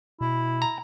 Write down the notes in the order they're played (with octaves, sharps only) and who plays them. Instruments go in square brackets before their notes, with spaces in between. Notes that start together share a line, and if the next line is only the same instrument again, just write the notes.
[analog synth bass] B2 [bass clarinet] E4
[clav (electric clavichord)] A#5